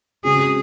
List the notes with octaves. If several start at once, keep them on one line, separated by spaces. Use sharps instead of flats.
C#3 G#3 C4 F#4 G#4